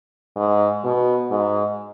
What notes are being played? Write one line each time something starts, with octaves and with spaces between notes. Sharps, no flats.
G#2
B2
G#2